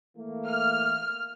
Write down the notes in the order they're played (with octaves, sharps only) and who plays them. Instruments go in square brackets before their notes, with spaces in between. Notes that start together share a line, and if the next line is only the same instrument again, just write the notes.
[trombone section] E3 A3 A#3
[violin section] F6